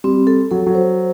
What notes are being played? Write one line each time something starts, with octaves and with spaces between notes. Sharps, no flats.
G3 C4
A4
F#3 A4
F#3
C5